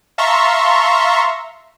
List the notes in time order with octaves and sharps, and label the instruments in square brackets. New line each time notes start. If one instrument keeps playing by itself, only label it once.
[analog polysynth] E5 F5 A5 A#5 C6 C#6